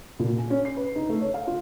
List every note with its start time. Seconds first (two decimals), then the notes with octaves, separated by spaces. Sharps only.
0.19 A#2
0.38 G#5
0.50 C#4
0.65 C7
0.77 B4
0.96 D#4
1.09 A3
1.21 C#5
1.34 F5
1.47 F4